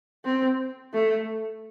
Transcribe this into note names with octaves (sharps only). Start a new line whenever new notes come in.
C4
A3